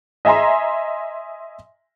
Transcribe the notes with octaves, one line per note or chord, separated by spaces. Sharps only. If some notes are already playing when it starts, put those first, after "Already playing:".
D#5 E5 G#5 A#5 C6